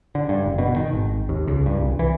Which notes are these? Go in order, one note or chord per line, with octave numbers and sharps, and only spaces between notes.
D3
G2
F#1
B2
D#3
G#1
D#2
C#2
G2
C2
E3